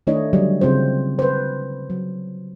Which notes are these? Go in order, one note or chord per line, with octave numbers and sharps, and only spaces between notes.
D#3 A3 D4 E4 C#5 D#5
D3 F#3 G3
C#3 C4 F4 C5
B4 C5
F#3